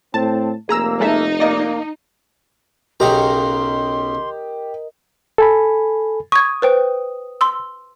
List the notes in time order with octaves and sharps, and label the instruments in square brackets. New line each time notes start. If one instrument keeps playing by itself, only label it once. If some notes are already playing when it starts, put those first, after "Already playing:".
[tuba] A2 [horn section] C4 [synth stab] A5
[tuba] F1 [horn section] A#3 [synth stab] G#4 A#5 E6
[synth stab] G#3 A4 E5 [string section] D#4
[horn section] A#3 [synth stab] D5 D#5
[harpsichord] B1 C#3 A#5 [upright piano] G4 [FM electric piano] A#4 D#5 [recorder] C6
[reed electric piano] A4 G#5 B5
[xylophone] C#6 G#6 [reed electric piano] D#6
[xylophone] B4 C5 G5
C6 E6